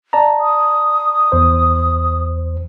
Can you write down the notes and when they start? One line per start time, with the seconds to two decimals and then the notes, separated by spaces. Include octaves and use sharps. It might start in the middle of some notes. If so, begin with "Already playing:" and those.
0.13 D5 A5 A#5
0.40 D#6
1.32 E2 C5